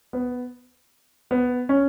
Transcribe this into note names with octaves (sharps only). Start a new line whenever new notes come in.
B3
B3
C#4